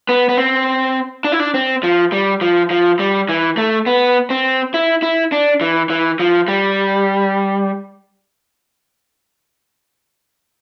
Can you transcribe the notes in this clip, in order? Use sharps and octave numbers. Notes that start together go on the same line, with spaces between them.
B3
B3
C4
D4
E4
D4
C4
F3
G3
F3
F3
G3
E3
A3
B3
C4
E4
E4
D4
E3
E3
F3
G3